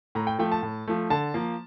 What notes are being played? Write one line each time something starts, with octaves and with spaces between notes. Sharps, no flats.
A2 A#5
G5
F3 A3 G5
A5
A2
F3 A3
D3 A5
F3 A#3